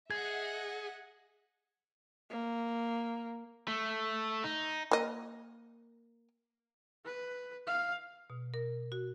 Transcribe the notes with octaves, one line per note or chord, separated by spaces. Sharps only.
G#4 D#5 E5 F#5 G#6
A#3
A3
D#4
A#3 D#5
B4
F5
B2
A#4
F#4